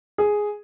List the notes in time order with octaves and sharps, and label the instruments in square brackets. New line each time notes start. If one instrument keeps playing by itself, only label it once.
[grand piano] G#4